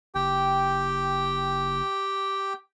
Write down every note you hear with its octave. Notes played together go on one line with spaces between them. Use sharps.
F#1 G4 G5